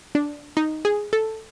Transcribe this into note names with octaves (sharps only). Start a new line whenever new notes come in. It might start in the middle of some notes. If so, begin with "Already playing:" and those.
D4
D#4
G#4
A4